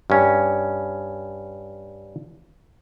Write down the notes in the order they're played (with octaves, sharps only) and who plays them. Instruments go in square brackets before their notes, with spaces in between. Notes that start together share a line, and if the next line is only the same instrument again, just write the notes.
[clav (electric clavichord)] G2 C#4